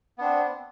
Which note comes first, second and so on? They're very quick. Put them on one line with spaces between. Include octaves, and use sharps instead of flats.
B3 D4 C4